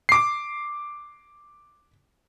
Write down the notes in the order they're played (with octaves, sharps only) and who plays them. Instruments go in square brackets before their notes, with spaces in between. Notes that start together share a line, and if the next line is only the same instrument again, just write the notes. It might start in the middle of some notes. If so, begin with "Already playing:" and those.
[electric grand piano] D6 C7